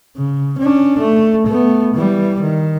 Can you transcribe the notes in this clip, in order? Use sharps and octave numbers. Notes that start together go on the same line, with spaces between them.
C#3
C#4 D4
A3
A3 B3
E3 G3
D#3